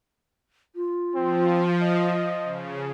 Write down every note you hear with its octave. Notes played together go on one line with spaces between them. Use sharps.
F4
F3 C4
D#5
C#3